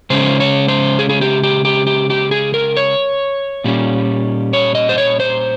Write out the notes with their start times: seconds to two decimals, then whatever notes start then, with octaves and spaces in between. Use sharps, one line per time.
0.10 C#3 G#3 C#4 C5
0.40 C#5
0.68 C5
0.99 G#4
1.09 G#4
1.21 G4
1.44 G4
1.65 G4
1.87 G4
2.10 G4
2.31 G#4
2.54 A#4
2.76 C#5
3.64 A#2 G3 C#4
4.53 C#5
4.75 D#5
4.89 C5
4.98 C#5
5.20 C5